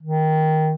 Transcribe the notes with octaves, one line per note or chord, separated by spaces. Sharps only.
D#3